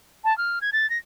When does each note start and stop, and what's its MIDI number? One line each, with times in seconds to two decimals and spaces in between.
0.24 0.36 81
0.38 0.59 89
0.61 0.70 92
0.73 0.89 93
0.90 0.98 94